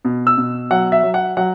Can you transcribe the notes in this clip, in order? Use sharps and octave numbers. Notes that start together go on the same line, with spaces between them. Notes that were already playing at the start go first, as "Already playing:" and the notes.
B2
E6
B2
F#3 F#5
E5
F#3
F#5
F#3 F#5